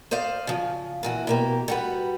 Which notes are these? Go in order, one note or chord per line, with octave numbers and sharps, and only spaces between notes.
C5 D5 D#5 F5
C#3 F3
A#2 E3 F#4
B2 A#3 G4
G3 F#4 B4